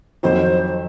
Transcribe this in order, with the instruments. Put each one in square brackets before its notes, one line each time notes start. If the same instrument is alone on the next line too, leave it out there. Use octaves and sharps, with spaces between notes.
[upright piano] F2 D#3 F#3 C4 [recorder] C5